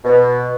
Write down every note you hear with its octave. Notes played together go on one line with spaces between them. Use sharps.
B2